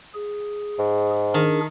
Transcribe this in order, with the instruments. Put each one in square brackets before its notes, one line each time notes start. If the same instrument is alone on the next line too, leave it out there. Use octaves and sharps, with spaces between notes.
[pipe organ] G#4
[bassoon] G#2
[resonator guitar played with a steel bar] D#3 [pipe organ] D4 G#4 A#4